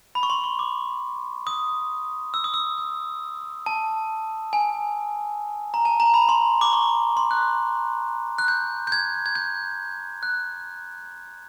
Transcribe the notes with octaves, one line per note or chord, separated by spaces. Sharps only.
B5
C#6
C6
C#6
D6
D#6
E6
D#6
E6
D#6
A5
G#5
A#5
A5
A#5
B5
C6
D6
C#6
C6
F#6
F#6
G6
G6
G#6
G#6
G6
F#6